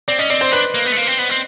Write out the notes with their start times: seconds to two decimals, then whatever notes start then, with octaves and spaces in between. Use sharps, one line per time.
0.08 C4 D5
0.19 C#4 D#5
0.30 C4 D5
0.41 C5
0.52 D4 B4
0.74 A#3
0.85 B3
0.92 A3
0.97 A#3
1.07 C4
1.19 B3
1.30 C4